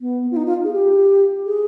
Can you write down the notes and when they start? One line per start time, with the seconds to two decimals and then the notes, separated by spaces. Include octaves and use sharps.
0.01 B3
0.31 F4
0.36 D#4
0.46 F4
0.64 G#4
0.73 G4
1.46 G#4